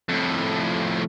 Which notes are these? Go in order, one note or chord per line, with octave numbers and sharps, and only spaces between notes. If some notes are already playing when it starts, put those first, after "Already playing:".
F2 A2